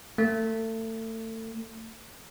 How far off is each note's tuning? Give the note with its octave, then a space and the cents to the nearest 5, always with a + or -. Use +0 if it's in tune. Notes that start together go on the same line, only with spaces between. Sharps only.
A3 +30